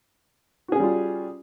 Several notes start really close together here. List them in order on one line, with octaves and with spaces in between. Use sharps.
F#4 G#4 C#4 G3 F4